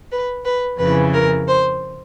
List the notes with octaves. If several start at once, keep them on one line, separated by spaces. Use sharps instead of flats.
B4
B4
F2 C#3 E3 B4
A#4
C5